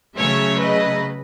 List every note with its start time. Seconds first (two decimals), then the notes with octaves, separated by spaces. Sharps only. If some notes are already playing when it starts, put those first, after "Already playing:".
0.15 C#3 F#3 A3 C#5 E5
0.58 B4 D#5